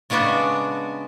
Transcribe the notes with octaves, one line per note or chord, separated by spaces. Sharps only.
C#3 G#3 B3 D4 F#4